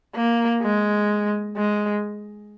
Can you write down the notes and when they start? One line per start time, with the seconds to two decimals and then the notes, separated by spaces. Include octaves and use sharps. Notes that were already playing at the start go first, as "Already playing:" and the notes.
0.16 A#3
0.62 G#3
1.57 G#3